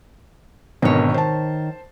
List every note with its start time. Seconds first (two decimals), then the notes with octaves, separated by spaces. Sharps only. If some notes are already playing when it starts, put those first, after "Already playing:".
0.82 G#1 B2 D3 D#3 C#5
1.14 C5 A5